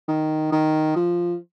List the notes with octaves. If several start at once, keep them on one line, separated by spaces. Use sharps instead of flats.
D#3
D#3
F3